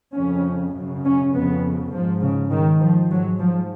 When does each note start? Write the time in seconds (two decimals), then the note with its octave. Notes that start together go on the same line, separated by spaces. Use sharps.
0.16 F2 C#3 C#4
0.74 F#2 C#3
1.04 C#4
1.33 F2 C#3 B3
1.92 G#2 F3
2.22 C#3
2.51 G#2 D#3
2.81 F3
3.10 G#2 F#3
3.40 F3